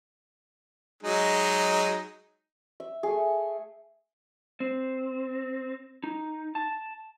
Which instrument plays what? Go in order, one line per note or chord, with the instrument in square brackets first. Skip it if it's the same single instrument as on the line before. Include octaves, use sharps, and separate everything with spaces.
[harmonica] F#3 G#3 D#4
[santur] E5
A3 G#4
[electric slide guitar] C4
D#4
A5